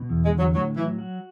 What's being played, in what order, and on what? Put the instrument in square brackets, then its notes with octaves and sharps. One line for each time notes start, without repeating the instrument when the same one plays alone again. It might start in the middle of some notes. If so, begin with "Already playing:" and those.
Already playing: [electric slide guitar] B2
E2
[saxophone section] G#3
[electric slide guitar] D3
[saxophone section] F#3
[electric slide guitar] A2 [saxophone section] F#3
[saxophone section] E3 [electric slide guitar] F#3
[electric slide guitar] F#4